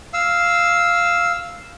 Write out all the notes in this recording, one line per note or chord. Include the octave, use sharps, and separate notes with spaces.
F5 E6